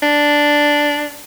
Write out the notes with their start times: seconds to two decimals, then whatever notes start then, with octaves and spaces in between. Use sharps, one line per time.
0.02 D4